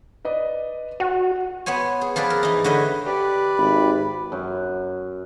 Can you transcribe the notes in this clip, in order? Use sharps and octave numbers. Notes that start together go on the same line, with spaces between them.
B4 D5 D#5
F#4 F#5
B3 C5 C#5 G#5
G#4
F3 G#4 B4 D5
A#4
E3 D#4
D3 B4 C#5 D#5 E5 G5
G4 B4 D5
G#1 B5
F#2